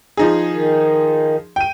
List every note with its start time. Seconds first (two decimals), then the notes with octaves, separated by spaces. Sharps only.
0.17 F3 D#4 G#4
0.53 D#3
1.56 G5 D#7